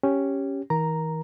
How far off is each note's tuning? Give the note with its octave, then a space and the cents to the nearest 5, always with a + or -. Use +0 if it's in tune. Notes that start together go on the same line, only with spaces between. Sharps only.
C#4 +0 G4 +0
E3 -40 A#4 +15 A#5 +0